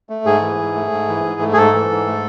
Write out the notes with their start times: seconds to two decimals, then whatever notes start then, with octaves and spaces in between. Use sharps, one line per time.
0.09 A3
0.25 G#2 G#4
0.42 E3
0.59 G#2
0.75 A3
0.91 G#2
1.08 E3
1.24 G#2
1.41 A3
1.53 G#4
1.57 G#2 A4
1.74 E3
1.90 G#2
2.07 A3